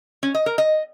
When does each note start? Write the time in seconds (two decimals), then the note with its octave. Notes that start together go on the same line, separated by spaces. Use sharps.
0.23 C#4
0.35 D#5
0.46 A#4
0.58 D#5